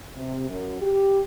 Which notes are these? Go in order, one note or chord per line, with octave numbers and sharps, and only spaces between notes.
C3
F#2
G4